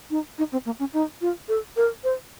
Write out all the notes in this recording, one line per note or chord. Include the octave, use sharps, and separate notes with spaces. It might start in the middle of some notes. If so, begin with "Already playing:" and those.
D#4
D#4
C4
A#3
C#4
D#4
F4
A4
A#4
C5